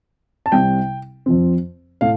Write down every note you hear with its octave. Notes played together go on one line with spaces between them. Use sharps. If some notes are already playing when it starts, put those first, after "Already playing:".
A5
C2 C3 G3 C4 G5
F2 F3 C4
A2 A3 F5